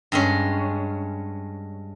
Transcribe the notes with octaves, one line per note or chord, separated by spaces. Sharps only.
G2 G#3 C#4